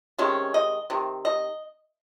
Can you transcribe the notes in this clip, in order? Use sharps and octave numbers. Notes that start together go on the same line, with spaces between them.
C3 D#3 G#3 C#4
D#5
C3 D#3
D#5